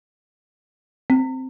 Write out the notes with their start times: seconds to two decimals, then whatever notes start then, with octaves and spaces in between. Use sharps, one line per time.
1.10 C4